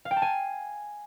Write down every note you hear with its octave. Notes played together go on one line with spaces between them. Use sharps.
F5
G5
A5
G#5